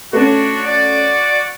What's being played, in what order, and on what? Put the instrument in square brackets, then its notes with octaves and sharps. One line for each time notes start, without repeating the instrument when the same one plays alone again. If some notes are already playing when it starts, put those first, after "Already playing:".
[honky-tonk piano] A3 C#4 [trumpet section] D4 F#4
[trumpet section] F#4 D5